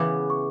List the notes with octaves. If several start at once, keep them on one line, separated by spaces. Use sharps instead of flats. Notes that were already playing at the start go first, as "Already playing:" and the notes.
Already playing: C#3 E3 B3 D6
C#6